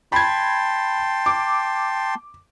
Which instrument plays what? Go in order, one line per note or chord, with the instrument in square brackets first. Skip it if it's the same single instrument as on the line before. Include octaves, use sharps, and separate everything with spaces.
[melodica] G5 A5 C6 [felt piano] B5 G#6
[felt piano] D6